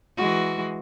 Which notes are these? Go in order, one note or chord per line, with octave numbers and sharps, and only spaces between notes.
E3 G#3 F#4